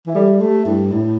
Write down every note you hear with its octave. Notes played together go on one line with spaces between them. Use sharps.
E3 E5
G3 A4 D5
A3 G4
G2 E4
A2 E4